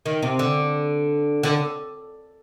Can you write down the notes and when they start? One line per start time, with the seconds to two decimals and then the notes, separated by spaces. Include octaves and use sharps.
0.06 D#3
0.23 C3
0.39 D3
1.43 D3